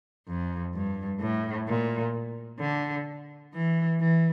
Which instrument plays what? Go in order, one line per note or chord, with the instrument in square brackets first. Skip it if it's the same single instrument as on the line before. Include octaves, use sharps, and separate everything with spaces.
[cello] F2
G2
A2
A#2
D3
E3
E3